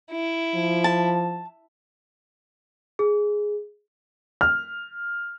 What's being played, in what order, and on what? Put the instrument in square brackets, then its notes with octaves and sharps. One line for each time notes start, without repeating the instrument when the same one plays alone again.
[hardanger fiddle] E4
[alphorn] F3
[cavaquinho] A5
[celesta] G#4
[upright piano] F6